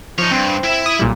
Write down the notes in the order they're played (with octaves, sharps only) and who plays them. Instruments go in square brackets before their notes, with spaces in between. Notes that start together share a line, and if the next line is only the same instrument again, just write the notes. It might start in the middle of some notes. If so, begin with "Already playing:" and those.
[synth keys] F3 [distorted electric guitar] D#4 C#5
[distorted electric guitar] G2 [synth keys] C4
[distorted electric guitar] E4 E5
[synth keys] D#6
B1 A#2 G3